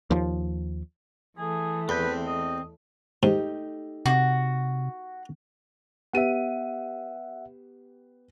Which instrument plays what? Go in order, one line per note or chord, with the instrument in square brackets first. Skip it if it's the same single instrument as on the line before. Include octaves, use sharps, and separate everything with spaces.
[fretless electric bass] D#2 F3
[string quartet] E3 A3 [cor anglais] G#4
[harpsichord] E2 [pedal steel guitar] C4 G6 [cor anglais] B4
[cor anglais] D#5
[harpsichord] G#2 [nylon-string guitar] A3 D#4 G4
[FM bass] C3 [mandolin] F#4
[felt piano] B3 G4 D#7 [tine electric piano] E5 F#5